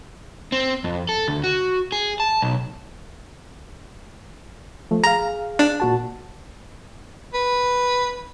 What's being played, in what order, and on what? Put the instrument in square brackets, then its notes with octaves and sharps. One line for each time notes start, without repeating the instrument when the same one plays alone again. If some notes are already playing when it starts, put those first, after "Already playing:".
[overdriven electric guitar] C4
F2
A4
D2
F#4
G#4
A5
B1
[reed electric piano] F3 A3
[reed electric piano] G#4 F5 [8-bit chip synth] A#5
[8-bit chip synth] D4
[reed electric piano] A#2 F#4 A5
[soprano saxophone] B4